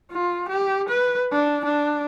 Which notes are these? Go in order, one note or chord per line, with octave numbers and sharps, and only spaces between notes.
F4
G4
B4
D4
D4